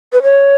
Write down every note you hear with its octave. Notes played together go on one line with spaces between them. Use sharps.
B4
C#5